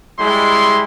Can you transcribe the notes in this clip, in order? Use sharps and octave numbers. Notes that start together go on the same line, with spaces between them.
G3 G#3 E4 C6